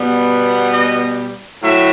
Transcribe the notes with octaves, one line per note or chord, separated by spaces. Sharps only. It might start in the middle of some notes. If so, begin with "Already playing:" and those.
Already playing: B2 G3 B3
D#5
A2 F#3 E5